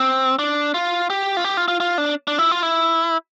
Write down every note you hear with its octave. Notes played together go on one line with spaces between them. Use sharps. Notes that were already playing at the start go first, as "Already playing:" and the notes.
Already playing: C4
D4
F4
G4
F4
G4
F4
F4
F4
D4
D4
E4
F4
E4